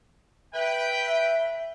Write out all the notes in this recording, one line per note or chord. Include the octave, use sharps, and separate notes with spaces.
B4 E5 G5